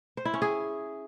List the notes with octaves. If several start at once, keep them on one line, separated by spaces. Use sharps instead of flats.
C5
E4
C#4
G#4